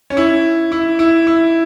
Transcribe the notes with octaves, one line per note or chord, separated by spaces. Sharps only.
C#4
E4
E4
E4
E4